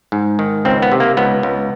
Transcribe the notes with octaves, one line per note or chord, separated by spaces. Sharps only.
G#2
D#3
C#2 C4
B3
C3
A#3
C#2 B3
C#2